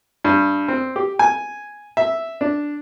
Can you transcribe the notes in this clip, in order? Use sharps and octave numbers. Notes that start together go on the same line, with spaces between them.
G2
C4
G4
G#5
E5
D4